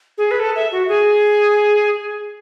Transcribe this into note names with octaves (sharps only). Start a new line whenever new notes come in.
G#4
B4
A4
E5
F#4
G#4